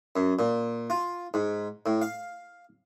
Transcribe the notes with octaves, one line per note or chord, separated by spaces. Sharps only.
F#2
A#2
F4
G#2
A2
F5